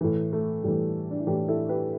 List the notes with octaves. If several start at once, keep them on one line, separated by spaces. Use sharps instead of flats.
A2 E3
A3
A2 E3 G3
D4
E4
A2 E3 D4 G4
E4 A4
G4 B4